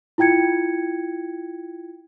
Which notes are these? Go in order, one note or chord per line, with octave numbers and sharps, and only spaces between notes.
E4 F4 G5 G#6 C#7